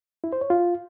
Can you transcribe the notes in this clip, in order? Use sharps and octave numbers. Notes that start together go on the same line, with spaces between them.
E4
C5
C#5
F4